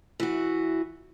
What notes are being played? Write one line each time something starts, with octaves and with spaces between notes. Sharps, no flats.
E3 F#4